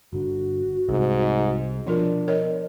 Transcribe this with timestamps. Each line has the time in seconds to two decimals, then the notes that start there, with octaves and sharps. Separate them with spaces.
0.13 G1 D3 F#4
0.89 C2 G#2 C3
1.87 B2 F3 D4 F4 A#4
2.28 A#4 C#5 D#5